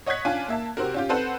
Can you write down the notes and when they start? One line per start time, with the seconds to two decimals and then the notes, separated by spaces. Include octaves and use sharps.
0.06 C#5 D#5 F#5 F#6 G#6 B6
0.25 C#4 D4 F4 G#5
0.48 A#3 E5 A5
0.77 C3 C4 F#4 A#4
0.94 C#4 F4 G4
1.09 C4 A4 B4 C5 F#5